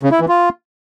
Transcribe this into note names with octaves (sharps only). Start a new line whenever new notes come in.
C#3
E4
E3
F4